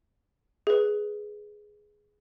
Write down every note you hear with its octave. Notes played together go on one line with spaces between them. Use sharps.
G#4 B4